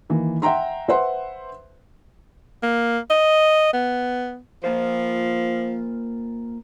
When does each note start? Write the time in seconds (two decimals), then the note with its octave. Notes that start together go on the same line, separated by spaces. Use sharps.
0.10 D#3 E3 A#3
0.42 E5 F#5 G5 A#5 C6
0.88 B4 C5 E5 F#5 C6
2.63 A#3
3.10 D#5
3.73 B3
4.64 F3 A#3 F4 C5